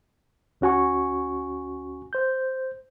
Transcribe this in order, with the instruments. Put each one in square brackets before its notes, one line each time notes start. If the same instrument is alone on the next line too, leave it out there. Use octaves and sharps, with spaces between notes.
[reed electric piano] D2 C#4 F#4 G#5 C#6
C5 G6